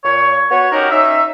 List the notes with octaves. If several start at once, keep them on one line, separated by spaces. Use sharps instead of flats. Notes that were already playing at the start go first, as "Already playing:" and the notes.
A#2 C#5
B3 F#4 C#5
C#4 D#4 F#4 G4 A#4
C#4 D#4 E5